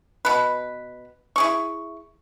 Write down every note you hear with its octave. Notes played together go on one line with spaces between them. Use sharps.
B2 B4
E4 G#4 C#6